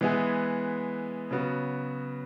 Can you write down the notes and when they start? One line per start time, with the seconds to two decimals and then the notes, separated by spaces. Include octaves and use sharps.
0.01 E3 G#3 B3 E4 G#4
1.31 C#3 F#3 B3 F#4